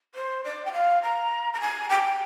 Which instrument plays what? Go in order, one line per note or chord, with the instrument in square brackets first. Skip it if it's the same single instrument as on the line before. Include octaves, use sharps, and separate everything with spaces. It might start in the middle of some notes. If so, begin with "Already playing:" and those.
[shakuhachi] C5
D5
G5
F5
A#5
A#5
G#5
G5